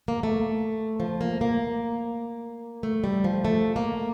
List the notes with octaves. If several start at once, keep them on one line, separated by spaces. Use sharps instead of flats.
A#3
A3
F3
A#3
A#3
A3
G3
F3
A3
A#3